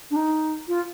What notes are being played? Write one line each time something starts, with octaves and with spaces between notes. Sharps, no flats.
D4
D#4
F4